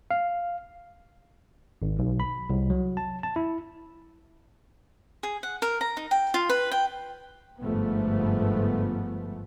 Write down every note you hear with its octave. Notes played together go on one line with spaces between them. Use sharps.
F5
G#1
B1
B5
C2
F#3
A5
A5
E4
G#4
F#5
A#4
A#5
D#4
G5
F4
B4
G5
G1 G#2 F3 A3 B3